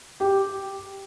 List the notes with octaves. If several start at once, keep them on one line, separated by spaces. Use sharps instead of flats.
G4